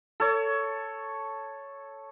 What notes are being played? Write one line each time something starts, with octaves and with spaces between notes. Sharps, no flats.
A4 C#5